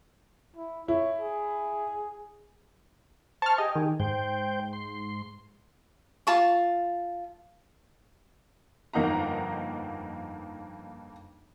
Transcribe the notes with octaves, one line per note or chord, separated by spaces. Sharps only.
E4
E4 C#5
G#4
C5 A5 C#6 F6
G4 G#4 D#5
D#3
G#2 C5 G5
C6
F4 A5 C#6
G1 F2 A#3 D#4 F#5 A#5